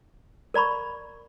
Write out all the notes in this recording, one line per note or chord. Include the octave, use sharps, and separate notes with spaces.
A#4 D5 A#5 B5 C#6